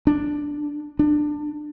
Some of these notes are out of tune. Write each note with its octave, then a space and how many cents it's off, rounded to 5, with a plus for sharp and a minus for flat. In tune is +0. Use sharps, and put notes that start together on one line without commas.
D4 +0
D4 +20